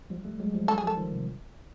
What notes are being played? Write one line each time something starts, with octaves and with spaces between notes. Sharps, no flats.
F3 G3
G3 A3
F#3 G#3
F3 G3
F#3 G#3 A4
G#4
F3 G3
A4
D#3 F3
C3